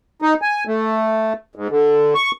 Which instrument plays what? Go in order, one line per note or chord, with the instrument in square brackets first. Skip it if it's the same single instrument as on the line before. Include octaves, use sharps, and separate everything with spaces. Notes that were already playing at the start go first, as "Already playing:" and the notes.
[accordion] D#4
G#5
A3
G#2
D3
C#6